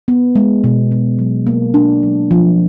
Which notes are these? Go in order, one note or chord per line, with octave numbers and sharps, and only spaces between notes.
B3
G#3
B2
B2
F#3
A#3
D4
F#3
F3